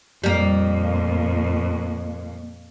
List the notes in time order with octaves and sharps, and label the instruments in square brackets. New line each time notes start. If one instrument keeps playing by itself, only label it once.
[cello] F2 A#2 [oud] G3 A#3